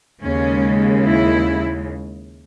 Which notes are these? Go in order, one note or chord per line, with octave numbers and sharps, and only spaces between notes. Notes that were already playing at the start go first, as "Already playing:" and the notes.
D#2 C#3 G#3 C#4
E4